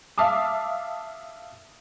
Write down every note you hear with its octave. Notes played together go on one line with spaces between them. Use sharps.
E5 F5 A5 D6 D#6